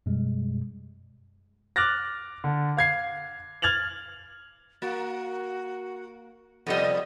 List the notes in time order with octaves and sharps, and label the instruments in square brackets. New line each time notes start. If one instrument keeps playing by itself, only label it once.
[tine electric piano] F#2 B2 G3 G#3
[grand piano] D6 F6 F#6 A6 A#6
D3
F5 G#6 C7
F6 G#6 A6 F7 F#7
[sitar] A#3 [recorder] F#4
[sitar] F2 C3 D#5 [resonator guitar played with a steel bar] G3 B3 [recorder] A4